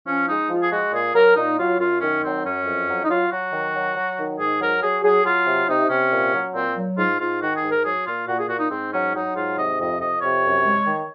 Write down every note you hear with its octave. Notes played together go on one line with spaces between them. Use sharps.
F3 C#4
G#3 D#4
F3 F4
G#4
G#3 F#4
A#2 G#4
F#3 A#4
A#2 D#4
F#3 F4
F#2 F4
D#3 C#4
F#3 C4
F#2 C#4
F2
F#3
D#4
F#3 F4
F#3 F#4
D#3
F#3
F#3
D#3
G#2 G#4
F#3 A#4
F#3 G#4
F#3 G#4
F#3 F4
C3
C3 D#4
C3 C#4
A#2
F#3
A#2 C4
F#3
G#2 F4
G#2 F4
D#3 F#4
G#4
G#2
A#4
F#3 G#4
A#2 F4
A#2 F#4
G#4
A#2 F#4
D#4
G#2 C4
F#3 C#4
F#3 D#4
G#2 F4
C3 D#5
F2 D#5
F2 D#5
C3 C#5
F#2
G#3
D#3